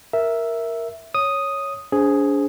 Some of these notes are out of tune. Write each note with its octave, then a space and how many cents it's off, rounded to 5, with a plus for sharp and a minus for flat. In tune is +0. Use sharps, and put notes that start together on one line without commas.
A#4 +0 E5 +0
C#5 +0 D#6 +0
D4 -40 G#4 +0 C5 +0